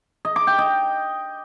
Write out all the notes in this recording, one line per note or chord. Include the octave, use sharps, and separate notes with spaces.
D#5
D6
G5
D#5